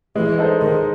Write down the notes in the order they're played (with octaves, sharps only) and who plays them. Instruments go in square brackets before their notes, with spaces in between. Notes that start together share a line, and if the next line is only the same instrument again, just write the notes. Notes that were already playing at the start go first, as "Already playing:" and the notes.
[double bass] E3 [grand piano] G#3
[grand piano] D#4 A4 C5
[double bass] D#3 [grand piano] G#3